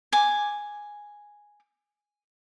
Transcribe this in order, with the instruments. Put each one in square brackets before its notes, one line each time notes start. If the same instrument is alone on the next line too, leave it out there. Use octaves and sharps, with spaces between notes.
[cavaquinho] G#5 D6